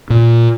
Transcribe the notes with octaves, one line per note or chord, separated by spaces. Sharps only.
A#2